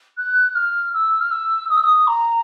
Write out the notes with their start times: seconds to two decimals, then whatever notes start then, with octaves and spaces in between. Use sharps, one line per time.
0.18 F#6
0.55 F6
0.94 E6
1.20 F6
1.31 E6
1.70 D#6
1.76 E6
1.83 D#6
2.07 A#5